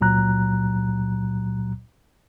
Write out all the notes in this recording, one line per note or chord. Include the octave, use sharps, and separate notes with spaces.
C#2 A#2 F#3 A#5 F#6